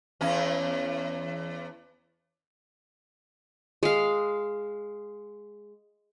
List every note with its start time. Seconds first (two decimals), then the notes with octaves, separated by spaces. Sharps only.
0.21 E2 C#4
3.83 G#3 F5